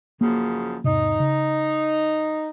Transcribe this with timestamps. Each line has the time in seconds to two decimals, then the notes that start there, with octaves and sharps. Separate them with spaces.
0.21 F#2 C#3 F3 A#3
0.84 E2 G#2 C3 D#4
1.20 C#3